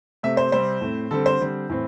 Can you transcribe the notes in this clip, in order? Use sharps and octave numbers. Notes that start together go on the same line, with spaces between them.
C3 A3 C4 E5
C5
C3 G3 C4 C5
A2 A3 C4
D3 G3 C4 A4
C5
D3 G3 C4
A2 E3 C4